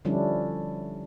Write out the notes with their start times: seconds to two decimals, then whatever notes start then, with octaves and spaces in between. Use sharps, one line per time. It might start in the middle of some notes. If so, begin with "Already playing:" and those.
0.05 D3 F3 G3 C#4 D4 E4